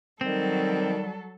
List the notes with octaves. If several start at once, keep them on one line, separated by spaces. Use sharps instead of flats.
D#3 F#3 G3 C4 A4